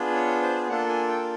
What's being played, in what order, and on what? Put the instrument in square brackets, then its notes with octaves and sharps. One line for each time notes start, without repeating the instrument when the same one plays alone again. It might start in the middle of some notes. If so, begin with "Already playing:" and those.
Already playing: [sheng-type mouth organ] B3 D4 F4 G#4
C#5
C5
A#3 D4 F4 A4 F#5
G#5
G5